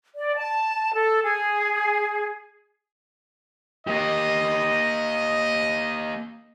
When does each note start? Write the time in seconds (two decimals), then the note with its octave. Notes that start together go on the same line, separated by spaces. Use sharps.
0.16 D5
0.36 A5
0.94 A4
1.23 G#4
3.87 A#3 G4 D#5